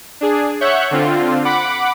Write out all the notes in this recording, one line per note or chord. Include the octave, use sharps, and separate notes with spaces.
D4 G#4
C#5 E5 F#5 C#6 F#6 G6
D3 C4 F4
F#5 B5 D6